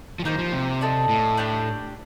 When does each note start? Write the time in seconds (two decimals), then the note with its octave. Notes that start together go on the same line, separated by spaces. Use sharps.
0.19 F3
0.25 D#3 A#3 D#4 G4 C5
0.39 F3
0.52 C3
0.81 D#4 A4 D5
1.09 A2
1.37 D4 G4 D5